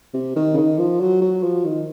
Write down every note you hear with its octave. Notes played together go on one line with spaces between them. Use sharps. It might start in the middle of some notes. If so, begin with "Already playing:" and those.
C3
D#3
C#3
D#3
F3
F#3
F#3
F3
D#3